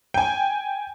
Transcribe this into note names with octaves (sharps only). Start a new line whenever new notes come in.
G5 G#5